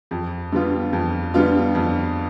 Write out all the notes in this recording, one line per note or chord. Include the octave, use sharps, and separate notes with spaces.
F2
D3 G3 B3 F4
F2
D3 G3 B3 F4
F2